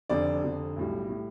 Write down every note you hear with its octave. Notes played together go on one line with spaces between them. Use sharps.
F1 F2 D3 D5
F1 F2 D3
B1 A2 G3
A2 G3